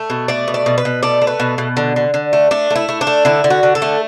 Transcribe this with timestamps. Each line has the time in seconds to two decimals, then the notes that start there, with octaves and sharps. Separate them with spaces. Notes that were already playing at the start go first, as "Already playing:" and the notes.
Already playing: A3
0.10 B2
0.28 A3 D5
0.48 B2
0.54 D5
0.66 B2
0.78 B4
0.85 B2
1.03 A3 D5
1.21 A3
1.27 B4
1.40 B2
1.58 B2
1.77 D3
1.96 D3
2.14 D3
2.33 A3
2.51 A3 D4
2.70 A3
2.76 E4
2.89 A3
3.01 D4
3.07 A3
3.25 D3 E4
3.44 D3
3.50 F#4
3.63 D3
3.75 A4
3.82 A3